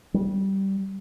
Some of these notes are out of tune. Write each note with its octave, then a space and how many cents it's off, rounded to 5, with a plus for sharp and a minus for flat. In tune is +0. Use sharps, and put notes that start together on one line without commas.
G3 -15